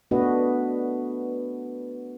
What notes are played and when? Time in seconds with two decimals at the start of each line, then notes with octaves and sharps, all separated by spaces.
0.11 A3 B3 D4 F#4 B4 D#5